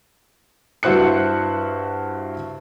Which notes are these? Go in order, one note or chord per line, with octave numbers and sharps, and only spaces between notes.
G2 E4 F#4 C5 F#6 C#7